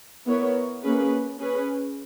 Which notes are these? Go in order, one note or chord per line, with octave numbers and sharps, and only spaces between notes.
B3 E4 A#4 C#5
A#3 C#4 G#4 B4
C#4 G#4 B4